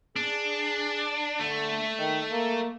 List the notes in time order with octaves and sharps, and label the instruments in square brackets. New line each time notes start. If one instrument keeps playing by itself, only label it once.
[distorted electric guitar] D4 [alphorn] G#4
[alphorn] D3 [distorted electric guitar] A3
[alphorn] D#3
A#3